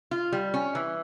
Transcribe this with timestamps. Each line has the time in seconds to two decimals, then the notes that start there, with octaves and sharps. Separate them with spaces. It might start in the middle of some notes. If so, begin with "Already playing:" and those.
0.11 F4
0.32 G3
0.54 C#4
0.75 E3